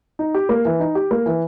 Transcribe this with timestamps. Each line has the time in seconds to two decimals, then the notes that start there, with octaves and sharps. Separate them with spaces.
0.19 D#4
0.34 G4
0.49 A#3
0.65 E3
0.80 D#4
0.95 G4
1.11 A#3
1.26 E3